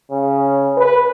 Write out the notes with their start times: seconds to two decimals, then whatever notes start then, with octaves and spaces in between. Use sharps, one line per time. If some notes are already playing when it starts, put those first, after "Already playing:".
0.12 C#3
0.78 B4